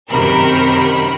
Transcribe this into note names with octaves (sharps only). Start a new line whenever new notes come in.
F#2 C3 D#3 A#4 B5